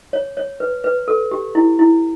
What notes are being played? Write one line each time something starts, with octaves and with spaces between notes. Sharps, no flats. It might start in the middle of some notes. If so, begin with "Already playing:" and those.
C#5
C#5
B4
B4
A4
G4
E4
E4